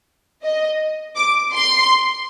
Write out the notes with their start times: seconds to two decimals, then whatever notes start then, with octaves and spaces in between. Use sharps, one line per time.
0.44 D#5
1.16 D6
1.53 C6